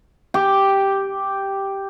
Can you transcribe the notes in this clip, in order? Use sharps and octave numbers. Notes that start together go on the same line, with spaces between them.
G4